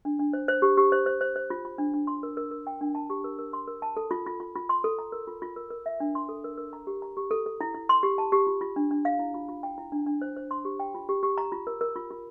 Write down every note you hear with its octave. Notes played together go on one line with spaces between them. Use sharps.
D4
D4
C5
C5
G4
G4
C5
C5
C5
C5
F4
F4
D4
D4
C6
A#4
A#4
A#4
G5
D4
A5
G4
A#4
A#4
C6
A#4
A5
A4
F4
F4
F4
F4
C6
A4
A#5
A#4
F4
F4
A#4
A#4
E5
D4
C6
A4
A#4
A#4
A#5
G4
A#5
G4
A4
A4
E4
E4
C6
G4
A5
G4
F4
F4
D4
D4
F5
E4
F4
F4
G5
E4
D4
D4
C5
C5
C6
G4
G5
F4
G4
G4
A#5
F4
A#4
A#4
F4
F4